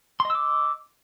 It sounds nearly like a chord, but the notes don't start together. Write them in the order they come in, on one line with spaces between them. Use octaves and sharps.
C6 D#5 E6 D6